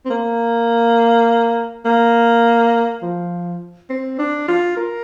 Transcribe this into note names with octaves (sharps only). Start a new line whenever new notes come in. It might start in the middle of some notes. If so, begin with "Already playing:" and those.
C4
A#3
A#3
F3
C4
D4
F4
A#4